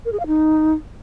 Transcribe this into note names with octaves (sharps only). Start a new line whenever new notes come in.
A#4
G#4
F5
D#4